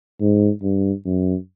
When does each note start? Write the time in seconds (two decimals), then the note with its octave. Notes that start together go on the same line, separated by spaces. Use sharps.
0.20 G#2
0.62 G2
1.06 F#2